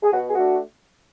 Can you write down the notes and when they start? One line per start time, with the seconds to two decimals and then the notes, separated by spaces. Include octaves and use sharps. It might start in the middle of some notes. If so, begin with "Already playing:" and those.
0.03 G#4
0.12 B2 F#4
0.29 G#4
0.35 A3 D4 F#4